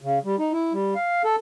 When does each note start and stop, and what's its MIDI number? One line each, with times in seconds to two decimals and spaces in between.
0.02 0.19 49
0.25 0.36 55
0.39 0.52 63
0.53 0.73 64
0.73 0.94 55
0.95 1.22 77
1.25 1.36 69